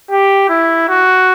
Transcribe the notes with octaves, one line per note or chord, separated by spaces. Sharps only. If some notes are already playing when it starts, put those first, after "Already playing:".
G4
E4
F#4